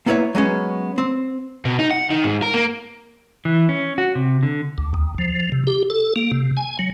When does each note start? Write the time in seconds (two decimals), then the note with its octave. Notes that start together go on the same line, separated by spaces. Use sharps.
0.06 A#3 B3 E4 A#4 C#5 E5
0.35 F#3 G#3 B3 C#4
0.98 C4
1.65 B2
1.79 D#4
1.91 F#5
2.11 D#3
2.24 G#2
2.43 A#4
2.54 A#3
3.45 E3
3.69 C#4
3.98 F#4
4.15 C3
4.43 D3
4.78 D2
4.94 D#2
5.18 F3
5.52 C3
5.67 G4
5.90 A4
6.16 A#3
6.32 C3
6.57 G#5
6.79 F#3